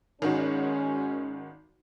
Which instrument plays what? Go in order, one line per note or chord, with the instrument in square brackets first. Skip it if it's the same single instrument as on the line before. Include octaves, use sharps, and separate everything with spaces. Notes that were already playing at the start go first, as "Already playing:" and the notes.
[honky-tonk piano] G#1 D#3 F#4 [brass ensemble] G#3 C#4